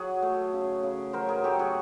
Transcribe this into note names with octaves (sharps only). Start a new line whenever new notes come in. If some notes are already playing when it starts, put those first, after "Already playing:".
Already playing: F#3 F#4 G#4
A3
C#3
C#3
F#3 A#4 C5
G#4 A#4
A3 G4 A4
F#4 G#4